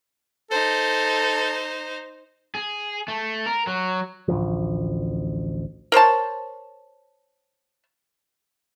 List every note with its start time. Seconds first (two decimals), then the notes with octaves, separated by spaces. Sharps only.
0.51 D#4 A4 C5
2.55 G#4
3.08 A3
3.46 A#4
3.67 F#3
4.28 A1 D2 F3
5.92 A#4 C5 C#5 A5